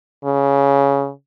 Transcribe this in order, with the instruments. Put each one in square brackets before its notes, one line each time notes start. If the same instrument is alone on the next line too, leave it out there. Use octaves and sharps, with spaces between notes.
[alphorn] C#3